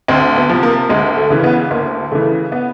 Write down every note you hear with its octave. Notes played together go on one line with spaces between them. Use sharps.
D2 C4
B3
C3 F3
A#3
D2 G#3
A3
C#3 E3
B3
D2 A#3
C#3 E3 A3
B3